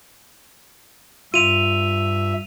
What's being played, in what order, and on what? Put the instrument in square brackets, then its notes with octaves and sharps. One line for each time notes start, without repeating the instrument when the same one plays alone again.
[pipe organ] G2 E5 [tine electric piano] F4 [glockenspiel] D#7 F7